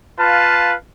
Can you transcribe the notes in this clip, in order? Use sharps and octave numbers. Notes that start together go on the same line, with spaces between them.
F4 B4 F5 A5